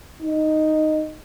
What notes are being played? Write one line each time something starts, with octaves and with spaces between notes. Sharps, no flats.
D#4